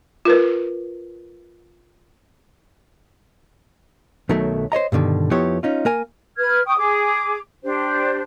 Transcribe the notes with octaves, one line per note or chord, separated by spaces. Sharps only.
F4 A#4 B4
B1 B2 D#3 F#3 A3
C5 C#5 D#5 A#5
G2 B2 D3 D#3
F2 F3 B3 E4 G4 C#5
C#4 D#4 F4
A#3 A#4 G#5
B4 F6 G#6
G5 C#6 D#6
G#4 D6
D4 G4 C5